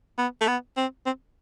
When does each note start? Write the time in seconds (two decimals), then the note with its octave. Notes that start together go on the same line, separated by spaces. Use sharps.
0.18 B3
0.41 A3
0.48 B3
0.77 C4
1.06 C4